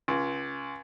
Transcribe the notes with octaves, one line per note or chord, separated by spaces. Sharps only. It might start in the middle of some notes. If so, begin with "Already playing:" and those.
C#2